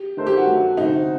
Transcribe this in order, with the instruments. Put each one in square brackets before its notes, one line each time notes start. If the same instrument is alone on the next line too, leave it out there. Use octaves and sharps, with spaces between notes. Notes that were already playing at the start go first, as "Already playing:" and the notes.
Already playing: [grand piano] G4
[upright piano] D#3 A3 D#4 A4 C5
[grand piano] G4
F#4
[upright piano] G2 F#3 A3
[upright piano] D2 C3 G3 C4 [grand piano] D#4